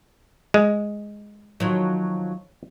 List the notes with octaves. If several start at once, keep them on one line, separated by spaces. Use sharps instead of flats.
G#3
D#3 F3 F#3